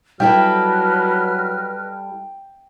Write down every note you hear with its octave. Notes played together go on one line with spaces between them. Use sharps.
F#3 G3 E4 A4 B4 D#5 G5 F6